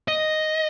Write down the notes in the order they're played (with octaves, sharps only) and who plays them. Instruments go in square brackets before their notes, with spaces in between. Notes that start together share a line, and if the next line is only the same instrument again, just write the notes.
[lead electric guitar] D#5